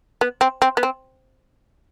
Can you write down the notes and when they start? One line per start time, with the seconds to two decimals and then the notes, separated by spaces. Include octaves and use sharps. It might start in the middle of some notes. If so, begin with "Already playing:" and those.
0.21 B3
0.41 C4
0.62 C4
0.77 B3
0.83 C4